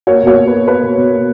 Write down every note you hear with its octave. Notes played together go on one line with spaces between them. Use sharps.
A#3 C#5
B2 C#5
B2
B4
A#3
A#3 B4
B2
B2
A#3